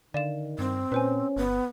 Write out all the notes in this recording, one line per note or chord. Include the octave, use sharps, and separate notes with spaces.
D3 D#3 D5 F5 E7
G2 C4
A#2 C#4 B4 C5 G#5
G1 B3